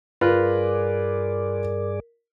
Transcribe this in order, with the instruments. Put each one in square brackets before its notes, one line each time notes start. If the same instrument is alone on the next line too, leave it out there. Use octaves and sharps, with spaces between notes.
[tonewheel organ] G2 G#4 D5 [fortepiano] F4 B4 [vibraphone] A#4